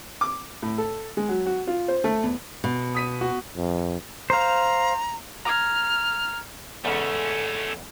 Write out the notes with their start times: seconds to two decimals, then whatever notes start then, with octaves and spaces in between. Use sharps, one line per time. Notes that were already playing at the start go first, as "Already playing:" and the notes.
0.21 D6
0.62 A2
0.78 A4
1.17 G#3
1.29 F#3
1.46 F#4
1.67 F4
1.88 C5
2.04 A3
2.23 E2
2.64 B2
2.94 D#6 B6 D#7
3.21 F#4
3.56 F2
4.30 C5 F5 A#5
5.45 A#5 F6 G#6
6.85 E2 G#2 C#3 A3 C#4 A4